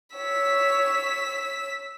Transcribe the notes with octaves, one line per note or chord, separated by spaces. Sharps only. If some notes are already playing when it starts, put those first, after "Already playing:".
C#5 E6 B6